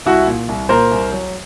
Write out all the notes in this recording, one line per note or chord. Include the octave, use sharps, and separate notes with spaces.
C2 E4 F#4
A#2
C2
A#2 A#4 C5
C2
F#3